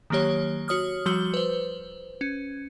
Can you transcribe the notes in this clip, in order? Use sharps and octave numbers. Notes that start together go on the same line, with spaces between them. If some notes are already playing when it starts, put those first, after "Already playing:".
D#3 F#3 A#3 G4 C#5
F#4 C#5 D#6 F6
F3 G3 F#4 E6 G7
B4 C5
C#4